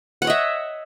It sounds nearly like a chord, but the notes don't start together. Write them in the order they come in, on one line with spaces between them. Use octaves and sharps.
F#5 C#5 D#5 E5